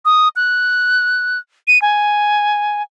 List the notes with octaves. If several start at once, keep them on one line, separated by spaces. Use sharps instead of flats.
D#6
F#6
D#7
G#5